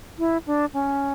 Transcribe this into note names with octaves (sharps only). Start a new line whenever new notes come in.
E4
D4
C#4